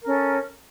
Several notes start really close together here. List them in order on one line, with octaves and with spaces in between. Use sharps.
A#4 C#4 A4